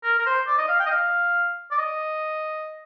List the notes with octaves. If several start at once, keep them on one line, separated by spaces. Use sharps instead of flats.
A#4
A#4
C5
D5
D#5
F5
G5
D#5
F5
D5
D#5